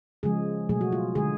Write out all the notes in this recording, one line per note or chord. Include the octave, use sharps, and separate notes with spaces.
C#3 F3 G#3 G#4
B2 F#3 A3 G#4
F#4
F4
D3 G#3 G#4